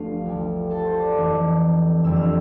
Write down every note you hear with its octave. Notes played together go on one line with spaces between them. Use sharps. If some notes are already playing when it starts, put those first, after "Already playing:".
Already playing: G1 G2 F3 A3 F4 F5
D2 D3 G3
A4 A5
C5 C6
D5 D6
F1 F2 E3 A3
F2 D3 G3 E6
F6